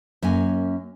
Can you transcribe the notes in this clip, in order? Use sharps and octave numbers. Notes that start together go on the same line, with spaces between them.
F#2 A#3 C#4 G#5